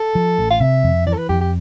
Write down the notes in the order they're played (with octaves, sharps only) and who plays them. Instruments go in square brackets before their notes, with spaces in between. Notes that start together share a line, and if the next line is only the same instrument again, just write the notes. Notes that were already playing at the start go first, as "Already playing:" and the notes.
Already playing: [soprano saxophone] A4
[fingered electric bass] F3
A1
[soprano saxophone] F5
[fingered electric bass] C3 [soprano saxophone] E5
[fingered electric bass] F2
[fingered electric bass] E3 [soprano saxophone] D5
[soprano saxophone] A4
B4
[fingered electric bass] F2 [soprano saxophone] G4
[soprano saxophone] G4